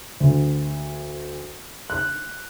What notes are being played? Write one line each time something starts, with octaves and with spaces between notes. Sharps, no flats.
D2
F#6